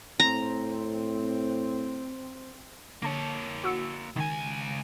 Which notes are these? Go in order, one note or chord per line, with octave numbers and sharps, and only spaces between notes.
A2 C4 A#5
D3 A#3 C#5 A5
F#4 E6 C#7
C#2 D#3 G#5